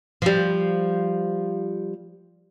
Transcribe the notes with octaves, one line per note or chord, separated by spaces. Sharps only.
F3 G3